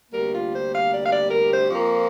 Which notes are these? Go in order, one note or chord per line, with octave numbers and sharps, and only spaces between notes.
D2 C3 G3 A#3 A#4
F4
C5
F5
D5
F5
D5
A#4
C5
F2 F3 A#3